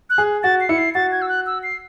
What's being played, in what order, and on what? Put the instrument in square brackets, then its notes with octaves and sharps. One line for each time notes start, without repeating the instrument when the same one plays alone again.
[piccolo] F#6
[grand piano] G#4
[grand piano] F#4 [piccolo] A6
[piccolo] C7
[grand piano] E4 [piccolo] C#7
[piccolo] C7
[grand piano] F#4 [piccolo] A6
[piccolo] G#6
E6
F#6
E6
C7